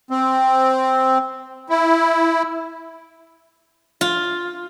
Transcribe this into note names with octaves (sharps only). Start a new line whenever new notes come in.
C4
E4
F4